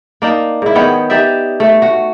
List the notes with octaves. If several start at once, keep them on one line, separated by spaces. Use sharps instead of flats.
A#3 D4 D#4
G#2 E4
D#3 B3 C#5 G5
D#4 G4 D5 E5
A3
F#4